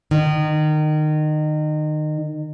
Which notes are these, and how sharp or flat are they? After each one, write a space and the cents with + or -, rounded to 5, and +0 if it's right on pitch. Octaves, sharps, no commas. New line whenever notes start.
D#3 -25